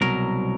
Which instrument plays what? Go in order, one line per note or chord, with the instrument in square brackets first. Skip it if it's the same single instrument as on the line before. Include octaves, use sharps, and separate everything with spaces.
[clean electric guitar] C2 B2 F#3 A#4